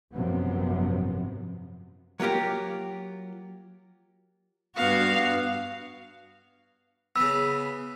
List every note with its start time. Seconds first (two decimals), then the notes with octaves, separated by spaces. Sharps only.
0.13 G#1 F#2 C3 F3 B3
2.20 F#3 A#3 F4 G4 A#4
4.76 G2 B3 F#4 F5
7.16 C#3 B3 E6